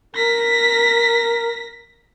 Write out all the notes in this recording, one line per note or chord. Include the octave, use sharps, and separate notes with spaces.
A#4 A#6 B6